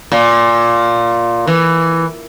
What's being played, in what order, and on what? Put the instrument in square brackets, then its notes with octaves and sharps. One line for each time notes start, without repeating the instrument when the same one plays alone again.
[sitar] A#2
E3